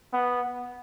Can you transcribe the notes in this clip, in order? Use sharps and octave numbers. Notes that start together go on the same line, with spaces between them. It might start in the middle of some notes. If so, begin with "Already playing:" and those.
B3